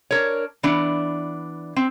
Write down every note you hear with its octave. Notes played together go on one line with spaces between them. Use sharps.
D4 A#4 C#5
E3 B3 D4
C4